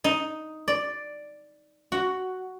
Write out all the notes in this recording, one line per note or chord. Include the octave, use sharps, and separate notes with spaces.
D#4
D5
F#4